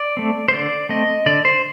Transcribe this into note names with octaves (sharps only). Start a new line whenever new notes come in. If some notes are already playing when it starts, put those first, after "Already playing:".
Already playing: D5
A3 C4
C5
D3 D5
A3 C4 D#5
D3 D5
C5